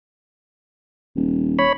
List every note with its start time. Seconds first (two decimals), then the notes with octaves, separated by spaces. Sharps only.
1.16 D#1
1.59 C#5 B5